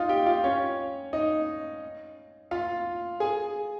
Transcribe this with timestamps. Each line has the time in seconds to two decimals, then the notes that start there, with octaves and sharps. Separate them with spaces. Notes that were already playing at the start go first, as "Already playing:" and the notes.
Already playing: D#4 F4 D#5 F5
0.09 G4 G5
0.26 F4 F5
0.44 C#4 C#5
1.13 D#4 D#5
2.51 F4 F5
3.20 G#4 G#5